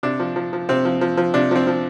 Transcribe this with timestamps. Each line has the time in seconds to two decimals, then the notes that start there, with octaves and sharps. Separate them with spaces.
0.03 C3 D4
0.20 F3
0.36 F3
0.53 F3
0.69 C3 C4
0.85 F3
1.01 F3
1.17 F3
1.34 C3 D4
1.51 F3 C4
1.67 F3